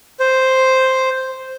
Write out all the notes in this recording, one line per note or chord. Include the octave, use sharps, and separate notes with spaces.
C5